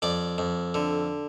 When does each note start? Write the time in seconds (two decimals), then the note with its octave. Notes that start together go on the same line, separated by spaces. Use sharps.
0.02 F2 D5
0.38 F2
0.74 D3